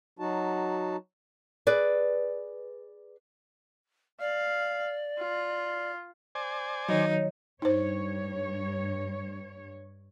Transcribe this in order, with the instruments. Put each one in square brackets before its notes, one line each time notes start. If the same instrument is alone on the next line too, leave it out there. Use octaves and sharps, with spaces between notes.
[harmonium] F#3 D#4 F#4 A5
[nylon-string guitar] G#4 B4 D5
[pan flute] D5 [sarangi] F5
[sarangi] F4
[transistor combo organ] C5 D5 G#5
[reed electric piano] D#3 F#3 [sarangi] D#4 [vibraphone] C#5
[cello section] G2 C#5 [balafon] D#4 C5